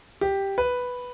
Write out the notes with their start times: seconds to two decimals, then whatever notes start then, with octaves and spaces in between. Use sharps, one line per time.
0.21 G4
0.58 B4